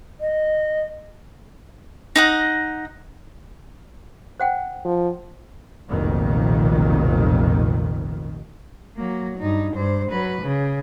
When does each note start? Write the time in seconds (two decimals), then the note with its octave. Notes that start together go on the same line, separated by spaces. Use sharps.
0.20 D#5
2.16 D#4 D#5 F#5
4.40 C5 F#5 G5
4.86 F3
5.89 F1 B1 F2 A#2 D#3
8.96 F#3 A#3
9.38 G2 D#4
9.74 G2 C5
10.11 F#3 B4
10.42 C#3